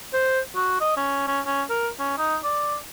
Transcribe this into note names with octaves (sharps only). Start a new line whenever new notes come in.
C5
F#4
D#5
C#4
C#4
C#4
A#4
C#4
D#4
D5